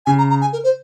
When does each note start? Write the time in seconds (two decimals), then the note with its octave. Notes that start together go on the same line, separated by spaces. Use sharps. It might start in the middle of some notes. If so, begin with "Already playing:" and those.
0.06 C#3 G#5
0.18 A#5
0.30 A#5
0.41 G#5
0.53 A#4
0.64 C5